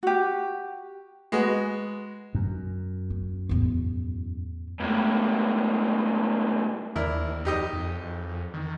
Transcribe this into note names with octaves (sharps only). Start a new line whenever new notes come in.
F#4 G4
G#3 B3 F#4
F#2
C#4
E2 A2
C#2 A2
D#2 D4 E4 A#4
F2 D#4 G4 D#5
F2
D#3